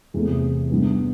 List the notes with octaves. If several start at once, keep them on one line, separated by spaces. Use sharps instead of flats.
E2 C3 E3 A3
G2 E3 B3